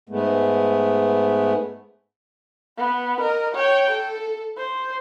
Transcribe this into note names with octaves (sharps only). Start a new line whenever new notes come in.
G#2 G#3 A3 B3
B3
A#4 D#5
C#5 G5
A4
C5